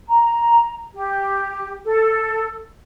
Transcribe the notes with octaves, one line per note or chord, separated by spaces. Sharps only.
A#5
G4
A4